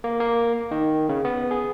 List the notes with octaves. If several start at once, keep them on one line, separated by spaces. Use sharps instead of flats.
A#3
A#3
D#3
C#3
B3
G#4